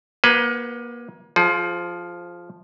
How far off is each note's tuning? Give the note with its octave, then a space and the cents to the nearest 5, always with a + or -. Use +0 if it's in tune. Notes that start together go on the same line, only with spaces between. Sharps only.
A#3 +30 F#4 +0 B4 +15
F3 +0 G#4 +40